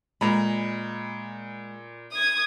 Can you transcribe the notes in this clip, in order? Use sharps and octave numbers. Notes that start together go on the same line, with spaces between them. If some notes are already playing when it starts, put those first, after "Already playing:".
A#2 G#3 A#5 B5
D#6 G#6